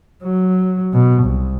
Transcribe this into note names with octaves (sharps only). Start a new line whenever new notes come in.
F#3
B2
C2